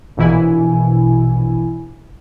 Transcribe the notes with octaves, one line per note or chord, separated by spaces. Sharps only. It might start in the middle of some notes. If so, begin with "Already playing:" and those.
A#1 B2 E3 E4 G#5